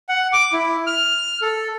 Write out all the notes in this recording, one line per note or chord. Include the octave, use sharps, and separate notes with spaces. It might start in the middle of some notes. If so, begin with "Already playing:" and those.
F#5
D6
E4
F6
A4